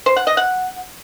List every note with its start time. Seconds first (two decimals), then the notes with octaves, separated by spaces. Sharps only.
0.06 C5
0.16 F#5
0.27 D#5
0.37 F#5